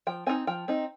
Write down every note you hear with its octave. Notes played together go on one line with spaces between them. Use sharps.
F3 G5
C4 D#4 G#5
F3 G5
C4 D#4